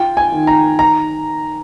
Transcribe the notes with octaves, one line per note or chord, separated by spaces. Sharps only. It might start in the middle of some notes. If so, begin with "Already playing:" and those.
Already playing: F4 G5
G#5
D#3
A#5
A#5